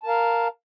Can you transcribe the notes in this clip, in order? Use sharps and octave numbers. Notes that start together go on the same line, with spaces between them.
A#4 F5 A5